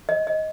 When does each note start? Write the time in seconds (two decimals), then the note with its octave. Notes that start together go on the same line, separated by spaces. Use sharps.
0.09 D#5
0.27 D#5